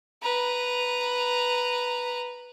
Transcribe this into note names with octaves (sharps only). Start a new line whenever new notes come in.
B4 A#5